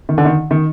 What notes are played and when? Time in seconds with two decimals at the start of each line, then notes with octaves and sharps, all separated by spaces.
0.09 D#3
0.18 D3
0.25 D#3
0.51 D#3